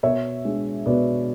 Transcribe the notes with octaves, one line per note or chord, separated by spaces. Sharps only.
B2 C#5 E5
G#3 D4
B2 B4 D5